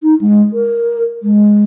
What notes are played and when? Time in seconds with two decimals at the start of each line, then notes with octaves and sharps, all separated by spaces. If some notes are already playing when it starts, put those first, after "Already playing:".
0.03 D#4
0.21 G#3
0.53 A#4
1.23 G#3